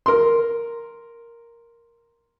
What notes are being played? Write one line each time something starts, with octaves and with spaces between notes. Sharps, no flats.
A#4 C6